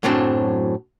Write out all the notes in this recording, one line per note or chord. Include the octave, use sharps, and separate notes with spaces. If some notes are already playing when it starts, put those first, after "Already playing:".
F#2 A2 F#3 C4 D4